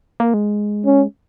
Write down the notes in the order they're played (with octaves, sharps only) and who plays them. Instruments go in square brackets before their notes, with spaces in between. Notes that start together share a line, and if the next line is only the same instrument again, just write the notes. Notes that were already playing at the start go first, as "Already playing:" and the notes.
[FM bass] A#3
G#3
[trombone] C#4